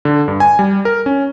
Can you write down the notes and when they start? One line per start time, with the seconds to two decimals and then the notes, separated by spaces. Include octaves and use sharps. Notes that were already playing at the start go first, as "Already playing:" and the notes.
0.05 D3
0.28 G2
0.40 G#5
0.59 G3
0.85 A#4
1.06 C#4